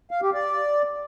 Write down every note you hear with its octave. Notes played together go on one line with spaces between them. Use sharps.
F5
G4
D5